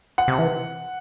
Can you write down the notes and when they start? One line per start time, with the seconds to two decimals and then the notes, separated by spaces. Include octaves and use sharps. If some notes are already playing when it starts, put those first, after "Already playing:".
0.18 F#5
0.28 C3
0.39 E3